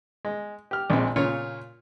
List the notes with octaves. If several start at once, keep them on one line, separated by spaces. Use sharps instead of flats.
G#3
G4 F6
A#1 G#3 C4
A#2 C#3 F4 C#5